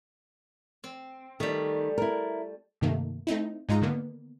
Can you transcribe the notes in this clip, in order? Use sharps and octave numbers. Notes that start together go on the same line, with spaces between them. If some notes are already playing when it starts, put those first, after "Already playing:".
C4
D#3 G3 A3
E4 A#4
G2 C3 D#3 A3 A#3
A3 C4 D#4 E4
G#2 G#3 D#4 F4 A#5 D#6
D3 D#3 A#3 B3